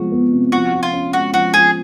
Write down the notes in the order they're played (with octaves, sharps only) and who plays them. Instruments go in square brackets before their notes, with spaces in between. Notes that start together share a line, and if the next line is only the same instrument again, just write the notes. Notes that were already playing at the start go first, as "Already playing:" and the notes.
Already playing: [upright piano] C3 F3 G#3 B3 [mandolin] F#4
[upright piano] B3
C3
[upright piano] F3 [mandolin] F#4
[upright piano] F3
[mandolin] F4
[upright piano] C#4
[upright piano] G#3 [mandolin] F#4
[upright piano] F3 [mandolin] F#4
[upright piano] F3 [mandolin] G#4